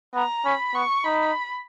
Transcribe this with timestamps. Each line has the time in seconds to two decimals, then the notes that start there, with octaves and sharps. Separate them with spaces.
0.14 B3 A#5
0.45 C#4 B5
0.74 B3 C#6
1.04 D#4 B5